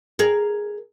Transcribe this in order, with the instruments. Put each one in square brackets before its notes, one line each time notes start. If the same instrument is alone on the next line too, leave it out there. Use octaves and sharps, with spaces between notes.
[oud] G#4 A#4